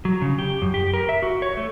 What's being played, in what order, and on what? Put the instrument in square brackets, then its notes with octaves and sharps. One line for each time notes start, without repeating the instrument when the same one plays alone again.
[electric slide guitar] F#3
C#3
G4
F#2
G4
A#4
E5
F#4
C#5
A3